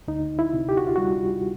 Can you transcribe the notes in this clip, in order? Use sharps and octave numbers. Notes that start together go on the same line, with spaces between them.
D2 D#4
E4
C3
G4
F#4
F4
G3 F#4